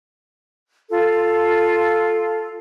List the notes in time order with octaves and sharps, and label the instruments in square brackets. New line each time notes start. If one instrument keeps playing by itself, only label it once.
[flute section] F4 A4